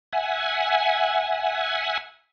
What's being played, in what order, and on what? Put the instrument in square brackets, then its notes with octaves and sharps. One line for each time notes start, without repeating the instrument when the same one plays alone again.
[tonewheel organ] E5 F#5 G#5